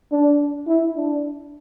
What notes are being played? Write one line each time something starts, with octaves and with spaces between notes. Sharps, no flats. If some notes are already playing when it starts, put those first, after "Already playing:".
D4
E4
D4